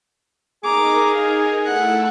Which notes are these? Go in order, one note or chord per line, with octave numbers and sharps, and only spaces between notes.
D#4 G#4 A#4 A#5 D6
F5
A3 E4 A4 F#5